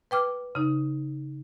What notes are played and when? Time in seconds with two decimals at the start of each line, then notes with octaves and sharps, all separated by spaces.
0.11 B4 G5 D6 F6
0.55 C#3 D#4